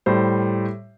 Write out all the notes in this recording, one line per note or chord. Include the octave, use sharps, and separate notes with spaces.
A2 G3 C5